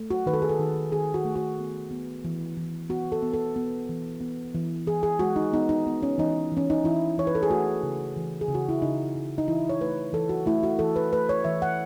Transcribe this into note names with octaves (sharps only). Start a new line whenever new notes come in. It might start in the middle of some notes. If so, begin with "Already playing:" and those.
Already playing: A3
F#4
D#3 B4
A4
G#4
A4
D#3
D#3 G#4
F#4
A3
F#4
B3
B3
E3
E3
B3 F#4
A4
B3
A4
B3
E3
B3
E3
E3 G#4
G#4
G#3 F#4
D#4
B3 D#4
D#4
B3
C#4
E3 D#4
E3 C#4
D#4
E3 E4
E3 C#5
B4
A4
G#4
A3 F#4
C#3
E3
G#4
C#3
F#4
E4
C#3 D#4
C#3
D#4
E3 E4
C#5
A3 B4
E3 A4
F#4
A3 E4
F#4
E3 A4
B4
A3 B4
C#5
E3 E5
F#5